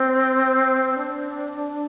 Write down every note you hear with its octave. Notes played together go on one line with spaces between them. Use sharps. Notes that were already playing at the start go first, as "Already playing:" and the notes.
Already playing: C4
D4